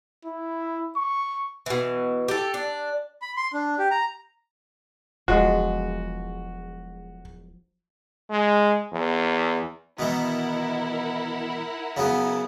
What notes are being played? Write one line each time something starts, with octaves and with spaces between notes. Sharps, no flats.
E4
C#6
B2 E3
G4 A4
D4
B5
C6
D4
G4
A#5
E1 F3 F#3 G#3 F#4
G#3
E2
B2 D#3 E3 E4 A#4 F#5
C#3 F#3 B3